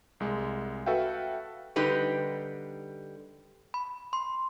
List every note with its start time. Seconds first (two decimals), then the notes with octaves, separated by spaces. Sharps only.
0.20 C2 G#3
0.86 F#4 A4 B4 E5 F5 G5
1.76 D3 G3 D#4 G4 B4
3.74 B5
4.13 C6